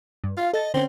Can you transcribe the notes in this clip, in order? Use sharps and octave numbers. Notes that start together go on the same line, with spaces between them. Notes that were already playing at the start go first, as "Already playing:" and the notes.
G2
F4 F5
A4 D#5 A6
D3 C4 C#4